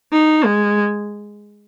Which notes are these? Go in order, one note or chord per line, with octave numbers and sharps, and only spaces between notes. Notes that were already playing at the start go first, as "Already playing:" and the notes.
D#4
G#3